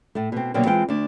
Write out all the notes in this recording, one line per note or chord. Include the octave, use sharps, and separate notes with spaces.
A2 A3
B2 C4
B2 D3 F#3 G3 A#3 C4
E3 G#3 C4 F4 G5
D2 D4